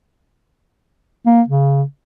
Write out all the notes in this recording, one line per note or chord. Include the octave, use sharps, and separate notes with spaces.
A#3
C#3